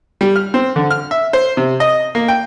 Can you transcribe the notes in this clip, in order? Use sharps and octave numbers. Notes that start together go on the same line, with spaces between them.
G3
F6
C4
D3
F6
E5
C5
C3
D#5
A#3
G5